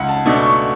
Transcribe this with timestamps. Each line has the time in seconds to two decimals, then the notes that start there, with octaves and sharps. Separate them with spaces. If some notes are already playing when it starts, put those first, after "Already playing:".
Already playing: C#2 F#5
0.09 A5
0.26 B2 A3 D4
0.42 C#6